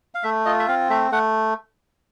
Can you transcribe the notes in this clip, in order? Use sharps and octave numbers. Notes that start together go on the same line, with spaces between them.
F5
A3 E5
F4 D#5
E5
C4 F5
A3 E5
A3 F#5